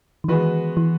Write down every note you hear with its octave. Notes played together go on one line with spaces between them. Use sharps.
D#3
E3 G#3 B3 F#4 B4
E3